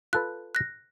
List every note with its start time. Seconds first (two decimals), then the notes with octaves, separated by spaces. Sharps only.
0.13 F4 A4 B4 F#6
0.55 F#6 A#6